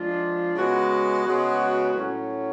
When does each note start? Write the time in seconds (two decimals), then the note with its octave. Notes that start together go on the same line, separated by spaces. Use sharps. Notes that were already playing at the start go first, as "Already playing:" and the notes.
Already playing: F3 G#3 D4 F4
0.55 C#3 G#3 B3 F#4
1.24 C#3 G#3 B3 F#4
1.93 A2 F#3 C#4